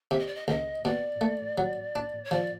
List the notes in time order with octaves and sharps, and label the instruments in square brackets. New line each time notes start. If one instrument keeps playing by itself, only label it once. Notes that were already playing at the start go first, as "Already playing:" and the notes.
[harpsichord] C3 [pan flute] E5
[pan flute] D#5
D5
D#5
[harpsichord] C#2 [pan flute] D#5
[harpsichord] B2 [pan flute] D5
[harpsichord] A3
F#3
D4
[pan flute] C#5
[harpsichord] F3 [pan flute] D5